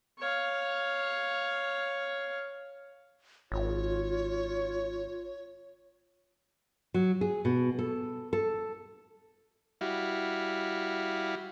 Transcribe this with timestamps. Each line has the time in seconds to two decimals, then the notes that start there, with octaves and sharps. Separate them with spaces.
0.19 C#5 F5
3.52 G#1 F4 C#5
6.94 F#3
7.21 G#4
7.45 B2
7.79 A4
8.33 A4
9.81 G3 E4 F#4 F5